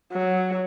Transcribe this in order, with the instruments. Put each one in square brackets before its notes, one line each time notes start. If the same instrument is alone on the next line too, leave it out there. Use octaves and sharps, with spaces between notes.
[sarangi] F#3